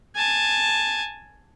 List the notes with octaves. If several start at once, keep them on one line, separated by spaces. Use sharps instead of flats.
G#5 A5